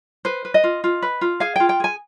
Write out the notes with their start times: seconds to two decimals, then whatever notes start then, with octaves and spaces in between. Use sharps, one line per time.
0.25 B4 C5
0.45 B4
0.54 D#5
0.64 F4
0.84 F4
1.02 B4
1.21 F4
1.40 G#4 F5
1.56 F4 G5
1.69 G5
1.80 G#4 G#5